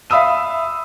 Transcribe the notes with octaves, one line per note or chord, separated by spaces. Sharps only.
E5 F5 B5 D#6 E6 D#7